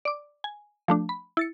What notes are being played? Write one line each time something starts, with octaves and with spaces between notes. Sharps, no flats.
D5 D6
G#5
F3 A3 D4
B5
E4 A6 C#7